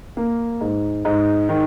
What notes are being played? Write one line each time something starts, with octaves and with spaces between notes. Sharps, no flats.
A#3
G#2
G#2
D#3